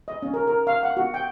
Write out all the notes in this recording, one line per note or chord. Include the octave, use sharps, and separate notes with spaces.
D#5
C#4
A#4
A#4
F5
F#5
F#4
G5